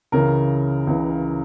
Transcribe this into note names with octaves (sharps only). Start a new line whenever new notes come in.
C#2 C#3 E3 A#4
C#2 C#3 E3